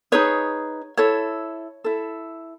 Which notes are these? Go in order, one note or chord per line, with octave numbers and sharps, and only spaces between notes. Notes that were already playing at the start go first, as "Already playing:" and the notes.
D#4 G#4 B4 C#5
E4 A4 C#5
E4 A4